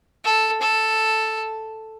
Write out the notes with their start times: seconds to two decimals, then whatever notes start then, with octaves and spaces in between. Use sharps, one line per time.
0.24 A4
0.61 A4